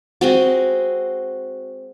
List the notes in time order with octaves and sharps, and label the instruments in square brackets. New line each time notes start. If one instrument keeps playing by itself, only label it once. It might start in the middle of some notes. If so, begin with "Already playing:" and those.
[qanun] G#3 C4 F#4